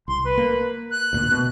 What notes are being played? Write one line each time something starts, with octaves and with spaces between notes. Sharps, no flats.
C2 C6
B4
A#3
F#6
D2 A#2
B2